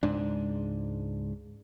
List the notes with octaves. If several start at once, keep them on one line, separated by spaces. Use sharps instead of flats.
C#2 G#2 D4